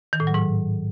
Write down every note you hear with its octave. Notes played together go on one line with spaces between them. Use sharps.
D#3
A2
F#3
G#2